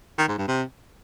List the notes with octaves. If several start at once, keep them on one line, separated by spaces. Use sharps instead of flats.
D#3
G#2
G2
C3